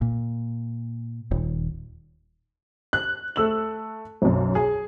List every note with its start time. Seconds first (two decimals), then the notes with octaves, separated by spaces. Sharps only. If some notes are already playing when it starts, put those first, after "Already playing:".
0.02 A#2
1.31 D#1
2.93 F#6
3.36 A3 E6 F#7
4.22 B1 F#2
4.55 G#4